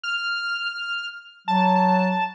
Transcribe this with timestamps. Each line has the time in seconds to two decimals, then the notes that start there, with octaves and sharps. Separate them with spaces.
0.04 F6
1.48 F#3 A5